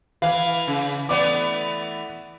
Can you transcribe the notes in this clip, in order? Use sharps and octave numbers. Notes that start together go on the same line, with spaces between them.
E3 B4 F5
C#3
E3 A3 B3 D5 D6